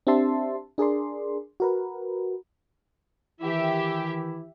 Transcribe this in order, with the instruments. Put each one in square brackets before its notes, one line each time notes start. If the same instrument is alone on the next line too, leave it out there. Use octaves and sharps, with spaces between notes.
[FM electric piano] C4 D4 G4 E5 A5 C6
D4 G#4 A#4 D5 C6
F#4 A#4 B4
[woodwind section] D#3 E3 E4 [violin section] G4 E5